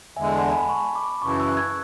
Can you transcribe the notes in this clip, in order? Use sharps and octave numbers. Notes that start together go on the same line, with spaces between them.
E2 D3 G#3 E5 G#5
F#5 A5
G#5 B5
A5 C#6
B5 D6
F#2 C#3 E3 A5 C#6
C#6 E6
F#6
E6 G#6